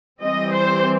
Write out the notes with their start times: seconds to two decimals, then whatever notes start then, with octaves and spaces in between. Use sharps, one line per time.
0.23 E3 G3 C4 D#5
0.53 C5